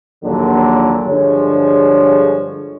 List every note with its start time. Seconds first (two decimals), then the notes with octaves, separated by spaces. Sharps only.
0.24 A#1 D#2 A#2 D3 F#3
1.07 G2 D3 F3 G#3 G#4 C#5